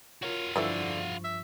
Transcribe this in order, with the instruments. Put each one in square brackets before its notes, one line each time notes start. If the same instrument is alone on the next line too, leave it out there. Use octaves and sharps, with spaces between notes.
[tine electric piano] F4 A#4 C#5 [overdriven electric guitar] F#4 F5
[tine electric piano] G2 F3 C#6 [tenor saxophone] D3 [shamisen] E3 A4 E5
[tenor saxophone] E5